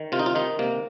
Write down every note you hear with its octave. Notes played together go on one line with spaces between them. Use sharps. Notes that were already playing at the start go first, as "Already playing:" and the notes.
Already playing: D#3
C3 F4
D#4
F4
D#3 D#4
C3 A#3